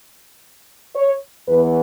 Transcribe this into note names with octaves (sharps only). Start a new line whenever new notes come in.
C#5
E2 E3 B3 B4